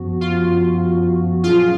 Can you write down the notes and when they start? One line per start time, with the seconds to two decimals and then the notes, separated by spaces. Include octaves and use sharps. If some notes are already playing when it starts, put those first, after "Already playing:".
Already playing: F#2 F3 B3 F#4
0.21 F4
1.43 A#2 F#3 C#4 F4 G#4